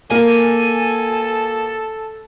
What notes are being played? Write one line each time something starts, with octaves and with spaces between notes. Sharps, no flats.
A#3 A4 G#5